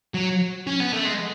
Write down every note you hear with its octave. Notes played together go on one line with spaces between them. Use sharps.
F#3
C#4
B3
A3
G#3